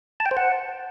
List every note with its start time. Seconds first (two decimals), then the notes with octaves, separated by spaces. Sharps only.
0.20 A5
0.26 G5
0.31 C5
0.37 F#5